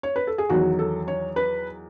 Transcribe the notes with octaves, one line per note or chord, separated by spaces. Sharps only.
C#5
B4
A4
G#4
E2 D#3 F#3 F#4
A4
C#5
B4